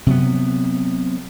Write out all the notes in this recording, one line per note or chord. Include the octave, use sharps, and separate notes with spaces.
C3 F#3 B3